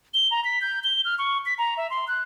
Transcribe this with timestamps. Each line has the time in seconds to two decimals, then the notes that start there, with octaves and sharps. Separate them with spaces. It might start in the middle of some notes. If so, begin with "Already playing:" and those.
0.14 G7
0.31 A#5
0.45 B6
0.62 G6
0.84 G7
1.05 F6
1.18 C#6
1.46 B6
1.58 A#5
1.77 E5
1.90 C6
2.08 F#6